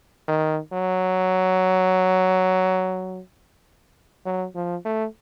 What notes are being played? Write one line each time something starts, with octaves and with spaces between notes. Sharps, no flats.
D#3
F#3
F#3
F3
A3